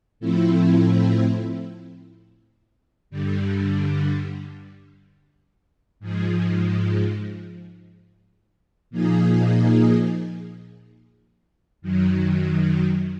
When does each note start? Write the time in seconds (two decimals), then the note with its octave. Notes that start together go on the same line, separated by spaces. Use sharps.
0.20 A2 F3 A3 C4 E4
3.10 G2 D3 G3
6.00 G#2 F3 G#3
8.90 A#2 F3 A#3 D#4 G#4
11.82 F#2 D#3 F#3